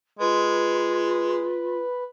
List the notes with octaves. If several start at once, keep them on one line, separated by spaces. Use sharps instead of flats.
G#3 F4 B4